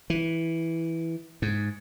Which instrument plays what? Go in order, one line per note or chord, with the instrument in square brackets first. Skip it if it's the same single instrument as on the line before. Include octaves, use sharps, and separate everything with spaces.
[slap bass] E3
G#2